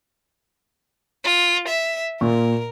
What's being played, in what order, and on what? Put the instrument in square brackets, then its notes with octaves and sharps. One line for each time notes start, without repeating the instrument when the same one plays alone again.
[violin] F4
E5
[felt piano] A#2 [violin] A#4